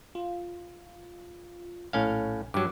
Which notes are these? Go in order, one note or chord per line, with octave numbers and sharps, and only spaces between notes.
F4
A#1 A2 C#4 F5
G2 F#3 D6